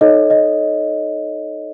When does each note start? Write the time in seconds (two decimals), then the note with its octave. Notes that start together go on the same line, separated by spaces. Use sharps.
0.01 D#4 A4 C#5 D#5
0.30 D#5